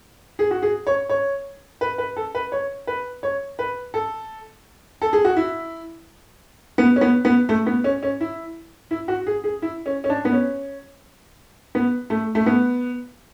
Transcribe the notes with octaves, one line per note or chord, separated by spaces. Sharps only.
G#4
F#4
G#4
C#5
C#5
B4
B4
A4
B4
C#5
B4
C#5
B4
A4
A4
G#4
F#4
E4
B3
C#4
B3
B3
A3
B3
C#4
C#4
E4
E4
F#4
G#4
G#4
E4
C#4
C#4
D4
B3
C#4
B3
A3
A3
B3